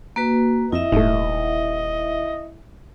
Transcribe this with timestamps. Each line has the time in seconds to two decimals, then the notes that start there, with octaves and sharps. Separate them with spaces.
0.16 A#3 F#4 B4
0.72 F2 E4 D#5 E5
0.92 D#1 G#2 A3